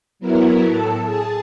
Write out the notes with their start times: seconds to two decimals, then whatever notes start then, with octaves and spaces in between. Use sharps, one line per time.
0.19 F#3 B3 E4 A#4
0.65 A2 A4 A5
1.03 G#4 A5